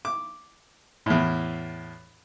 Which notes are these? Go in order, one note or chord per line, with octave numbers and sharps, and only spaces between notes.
D6
E2 A2